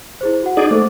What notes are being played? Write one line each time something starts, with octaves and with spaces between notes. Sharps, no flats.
E4 G#4 C5
F#4 F#5
D#4 G#4 D5
A3 C5 D6